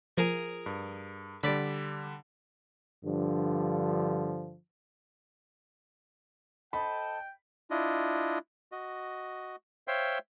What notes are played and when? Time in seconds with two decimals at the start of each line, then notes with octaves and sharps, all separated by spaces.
0.17 F3 G#4 A#4 G#5
0.66 G2
1.43 D3 G3 D5 B5
3.05 G2 D3 F3
6.73 A4 C5 D#5 G5 A5 B5
7.71 D4 E4 F4 D#5
8.72 F#4 D#5
9.88 C5 C#5 E5 F5 G5 C6